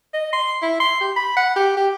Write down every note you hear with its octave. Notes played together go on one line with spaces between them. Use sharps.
D#5
C6
E4
C6
G4
B5
F#5
G4
G4